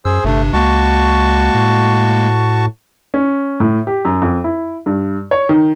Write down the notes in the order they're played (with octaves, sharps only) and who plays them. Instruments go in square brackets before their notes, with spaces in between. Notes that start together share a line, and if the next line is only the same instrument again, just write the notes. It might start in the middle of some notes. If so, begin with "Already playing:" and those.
[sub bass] F#2 [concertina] G#4 C5 [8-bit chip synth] E6
[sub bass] G1 [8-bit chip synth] G2 C3 D4 [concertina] A3
[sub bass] C#2 [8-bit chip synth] G#3 A#3 [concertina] F#4 A5 C#6
[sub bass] A2
[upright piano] C#4
A2
G4
F#2
F2
E4
G2
C#5
D#3